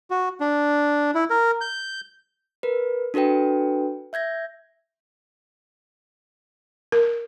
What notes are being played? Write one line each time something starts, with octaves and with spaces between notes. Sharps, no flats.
F#4
D4
E4
A#4
G6
A#4 B4
D4 F#4 A4 B4 G5
E5 G6 G#6 A#6
A#4